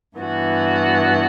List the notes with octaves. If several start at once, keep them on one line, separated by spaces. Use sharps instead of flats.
G2 E3 B3 F#4